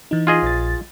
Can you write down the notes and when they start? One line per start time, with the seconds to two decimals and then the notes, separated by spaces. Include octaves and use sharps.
0.11 E3 D#4
0.27 F4 G#4 D#5
0.43 A#1 A6